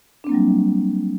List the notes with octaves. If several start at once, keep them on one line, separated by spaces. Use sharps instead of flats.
F#3 G3 A#3 C4 D4